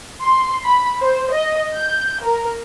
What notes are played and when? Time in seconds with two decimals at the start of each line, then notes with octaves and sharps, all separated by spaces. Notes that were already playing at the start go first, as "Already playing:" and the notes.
0.22 C6
0.65 B5
1.01 C5
1.33 D#5
1.75 G6
2.24 A#4